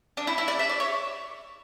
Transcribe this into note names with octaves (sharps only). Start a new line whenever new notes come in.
D4
E4
E4
D5
E5
D5
C#5